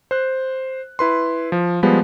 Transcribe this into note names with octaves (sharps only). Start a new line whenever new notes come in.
C5 F#6
E4 B4 C6
F3
F3 G3 G#3 B3